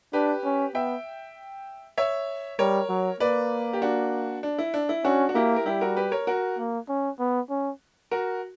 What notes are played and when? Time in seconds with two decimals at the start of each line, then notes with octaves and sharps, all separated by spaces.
0.13 D4 G4 B4
0.44 C#4
0.74 B3 E5 G5
1.98 C#5 E5
2.59 G3 A#4 C#5
2.89 F#3
3.20 A#3 B4 D5
3.73 G4
3.82 D4 F#4
4.43 D4
4.58 E4
4.74 D4
4.89 E4
5.04 C#4 D4 F#4
5.29 F#4
5.35 A#3 E4 G4
5.56 A#4
5.66 G3 E4 G4
5.81 F#4 A#4
5.96 G4 B4
6.11 A#4 C#5
6.27 F#4 A#4
6.58 A#3
6.89 C#4
7.19 B3
7.50 C#4
8.11 F#4 A#4